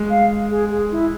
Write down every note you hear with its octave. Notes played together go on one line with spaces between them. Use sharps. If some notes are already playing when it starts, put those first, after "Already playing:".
Already playing: G#3
F5
G#4
G#4
E4